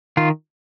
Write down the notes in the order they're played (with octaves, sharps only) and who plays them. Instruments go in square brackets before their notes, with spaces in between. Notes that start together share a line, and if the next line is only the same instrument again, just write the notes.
[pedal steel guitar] D#3 F4